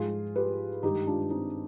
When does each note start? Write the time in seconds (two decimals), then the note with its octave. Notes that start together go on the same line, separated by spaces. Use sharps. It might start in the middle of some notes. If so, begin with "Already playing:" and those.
Already playing: G#2 F3 G#3 F4 G#4
0.36 G4 B4
0.83 G2 D#3 G#3 D#4 G4
1.07 D4 F4
1.30 C4 D#4